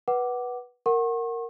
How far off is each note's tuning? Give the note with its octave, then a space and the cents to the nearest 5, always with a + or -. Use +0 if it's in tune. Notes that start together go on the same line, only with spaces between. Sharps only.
B4 -15 F#5 +15 D6 +0
A#4 -10 F#5 +0 C#6 -40